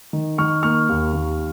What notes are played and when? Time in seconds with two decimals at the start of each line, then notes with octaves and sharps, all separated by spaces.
0.13 D#3
0.38 D#3 C#6 F6
0.63 A#3 C#6 F6
0.89 D#2
1.13 D#2